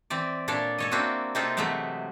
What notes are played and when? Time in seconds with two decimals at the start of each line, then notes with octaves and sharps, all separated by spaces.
0.10 E3 C4 D5
0.48 A#2 D4 A4 C#5 D5
0.78 A4 C#5 D#5
0.91 A#3 C4 D4 E4 F#4
1.35 C3 A#3 C4 D#4 F4 A4
1.57 C3 E3 F#3 G#3 A3 B3